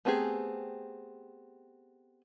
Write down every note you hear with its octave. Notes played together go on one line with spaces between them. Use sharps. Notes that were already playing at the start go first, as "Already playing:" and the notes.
A3 B3 C4 G4 G#4